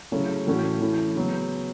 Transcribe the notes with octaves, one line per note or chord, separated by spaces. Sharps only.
C#3 F#3 A3 C#4 E4
A2 E3 A3 C#4 F#4
E3 A3 C#4 E4
C#3 F#3 B3